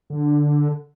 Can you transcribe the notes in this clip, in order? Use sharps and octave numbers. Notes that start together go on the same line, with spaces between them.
D3